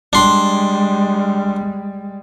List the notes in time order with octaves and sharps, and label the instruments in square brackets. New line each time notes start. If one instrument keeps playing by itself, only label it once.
[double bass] G3 G#3 [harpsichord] D4 C6